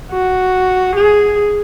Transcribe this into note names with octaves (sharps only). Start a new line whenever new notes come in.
F#4
G#4